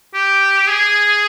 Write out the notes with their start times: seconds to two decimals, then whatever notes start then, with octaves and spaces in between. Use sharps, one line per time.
0.14 G4
0.69 G#4